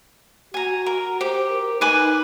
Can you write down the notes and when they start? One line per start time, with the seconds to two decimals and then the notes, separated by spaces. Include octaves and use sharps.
0.54 F#4 G#5 A#5
0.86 A#4
1.21 G4 C5
1.51 A#4
1.81 D#4 B4 G#5 D6